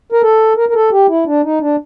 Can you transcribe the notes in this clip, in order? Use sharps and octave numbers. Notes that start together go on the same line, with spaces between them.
A#4
A4
A#4
A#4
A4
G4
E4
D4
D#4
D4